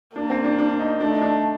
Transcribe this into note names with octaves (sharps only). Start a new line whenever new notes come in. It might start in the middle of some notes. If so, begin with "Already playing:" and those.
A#3 D4
C4
D4
D4
D#4
A3 D4
D#4
D4